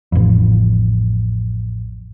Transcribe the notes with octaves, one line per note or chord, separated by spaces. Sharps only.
A1 F2